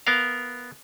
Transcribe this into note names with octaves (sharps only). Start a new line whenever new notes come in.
B3 A#4 F5